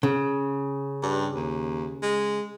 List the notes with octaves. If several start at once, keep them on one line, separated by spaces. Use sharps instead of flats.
C#3
G2
D#2
G#3